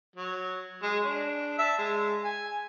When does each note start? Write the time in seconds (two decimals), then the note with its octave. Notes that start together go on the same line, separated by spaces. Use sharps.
0.16 F#3
0.83 G#3
1.05 D4
1.58 E5 A5 E6
1.78 G#3
2.24 G#5